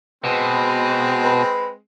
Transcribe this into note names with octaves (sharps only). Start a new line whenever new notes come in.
B2 G#3 C4 B4
B4